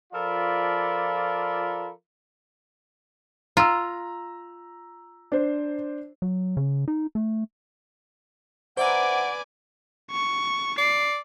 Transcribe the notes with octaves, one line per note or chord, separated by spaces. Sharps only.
F3 F4 A4 A#4 D5 B5
F4 A#5 E6
D4 C5
F#3
C#3
D#4
A3
B4 C5 D5 E5 F#5 G#5 A#5 D6
C#6
D5 C7